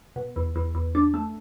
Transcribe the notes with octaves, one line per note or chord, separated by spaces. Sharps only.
B2
E2
E2
E2
D4
A3